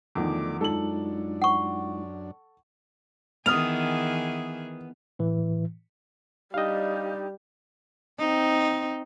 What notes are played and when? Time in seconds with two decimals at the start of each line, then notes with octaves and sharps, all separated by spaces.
0.15 E2 D3 D#3 F3 A3 D6
0.61 F#2 G#3 D4 D#4 F4 A4 F#7
1.42 F#5 C#6
3.46 D#3 E3 B3 G#4 D#6 F6 F7
5.19 A2 E3
6.54 G3 D4 D#4 G4 D#5 F5
8.19 C4 D#4